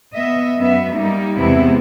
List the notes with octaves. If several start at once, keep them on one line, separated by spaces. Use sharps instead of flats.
B3 D#5 E5
F#2 B3 E5
G3 A#3 D#4
E2 C3 G#3 B3 E4